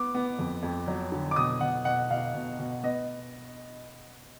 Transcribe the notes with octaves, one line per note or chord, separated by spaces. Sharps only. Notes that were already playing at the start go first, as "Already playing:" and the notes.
Already playing: B3 D6
B3
F2
F2
F#3
D3
D6
B2 D#6
B2 F#5
B2 F#5
B2 F5
B2
B2
B3 D#5